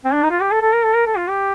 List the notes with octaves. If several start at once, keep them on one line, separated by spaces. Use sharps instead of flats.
C4
D4
D#4
F4
G4
A4
A4
A#4
A4
A#4
A4
F4
G4